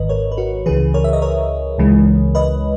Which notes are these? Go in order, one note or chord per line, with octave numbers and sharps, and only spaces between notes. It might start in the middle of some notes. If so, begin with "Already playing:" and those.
Already playing: G#1 G#2 D#3 B4 D#5
A#4 C#5
B4
F#4 A#4
C#2 C#3 E3 G#4 B4
A#4 C#5
E5
D#5
A#4 C#5
C#2 C#3 E3 G#3
B4 D#5